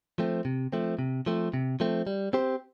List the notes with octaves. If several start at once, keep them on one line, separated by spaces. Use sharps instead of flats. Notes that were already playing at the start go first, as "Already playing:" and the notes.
F3 A3 C4
C3
F3 A3 C4
C3
F3 A3 C4
C3
F3 A3 C4
G3
C4 G4 C5